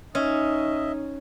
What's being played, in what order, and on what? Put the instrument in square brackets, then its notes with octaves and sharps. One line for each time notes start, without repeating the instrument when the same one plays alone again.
[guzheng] C#4 [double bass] D#4 [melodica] D#5 E5